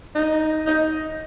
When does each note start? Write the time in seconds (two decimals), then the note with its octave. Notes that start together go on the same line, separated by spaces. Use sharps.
0.15 D#4
0.66 D#4